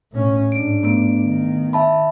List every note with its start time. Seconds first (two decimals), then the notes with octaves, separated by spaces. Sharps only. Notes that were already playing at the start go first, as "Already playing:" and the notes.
0.12 A2 C#4
0.52 G#2 D4 D7
0.83 A3 B3 D7
1.22 D#3
1.73 E5 A5 B5